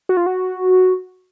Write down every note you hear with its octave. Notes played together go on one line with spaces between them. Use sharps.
F#4
F4
F#4